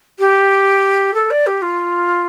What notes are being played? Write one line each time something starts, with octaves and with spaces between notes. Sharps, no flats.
G4
A4
D5
G4
F4